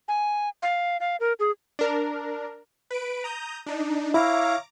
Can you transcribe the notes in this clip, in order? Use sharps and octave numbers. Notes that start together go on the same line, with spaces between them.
G#5
F5
F5
A#4
G#4
D4 A#4
B4 D7
A#5 D#6 G6
D4 D#4
E4 C#5 E5 F5 A#5 D6